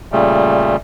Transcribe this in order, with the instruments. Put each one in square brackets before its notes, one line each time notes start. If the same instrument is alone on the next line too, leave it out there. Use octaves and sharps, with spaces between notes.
[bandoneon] A#2 C#3 G3 A3